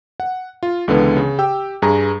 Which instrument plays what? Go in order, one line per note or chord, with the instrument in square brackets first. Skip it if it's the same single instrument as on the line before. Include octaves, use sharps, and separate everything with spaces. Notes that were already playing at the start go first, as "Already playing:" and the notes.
[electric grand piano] F#5
F4
C#2 D3 E3 B3
C#3
G4 G5 E6
G2 G#4 A#5